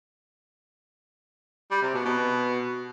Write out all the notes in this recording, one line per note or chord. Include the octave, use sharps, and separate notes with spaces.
G3
C3
B2
B2